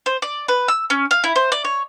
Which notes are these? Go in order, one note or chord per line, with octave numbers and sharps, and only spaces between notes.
C5
D5
B4
E6
C#4
F5
E4
C5
D5
C#5